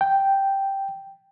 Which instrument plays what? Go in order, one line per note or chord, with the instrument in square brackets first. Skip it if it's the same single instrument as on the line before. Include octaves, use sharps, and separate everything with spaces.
[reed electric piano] G5